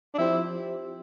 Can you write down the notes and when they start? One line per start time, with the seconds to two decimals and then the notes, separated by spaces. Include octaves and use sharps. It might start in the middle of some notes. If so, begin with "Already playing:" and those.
0.15 D4
0.18 F3 C4 E4 G4 C5